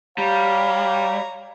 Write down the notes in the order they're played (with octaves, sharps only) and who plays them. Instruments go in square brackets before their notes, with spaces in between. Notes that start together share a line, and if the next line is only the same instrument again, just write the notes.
[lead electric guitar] G3 [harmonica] C#5 A#5 [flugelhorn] F5